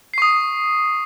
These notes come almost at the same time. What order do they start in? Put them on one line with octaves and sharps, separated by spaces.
C7 C#6 D#6